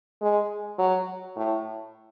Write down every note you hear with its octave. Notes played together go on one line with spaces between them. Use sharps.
G#3
F#3
A2